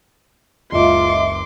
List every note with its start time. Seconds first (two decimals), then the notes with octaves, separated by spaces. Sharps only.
0.72 F#1 C#2 F4 D#5 E5 C6 D6